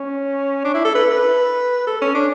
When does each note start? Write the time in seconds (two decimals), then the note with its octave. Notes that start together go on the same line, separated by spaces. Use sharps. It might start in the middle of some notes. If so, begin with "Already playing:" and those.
Already playing: C#4
0.64 D4
0.74 E4
0.85 A4
0.95 B4
1.11 B4
1.87 A4
2.01 C#4
2.14 D4